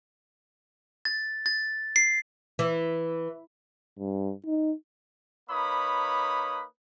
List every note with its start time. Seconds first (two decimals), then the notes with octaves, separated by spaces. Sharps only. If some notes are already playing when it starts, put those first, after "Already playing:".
1.05 A6
1.46 A6
1.96 C7
2.59 E3
3.99 G2
4.46 D#4
5.50 A#3 D#4 B4 C#5 B5 D#6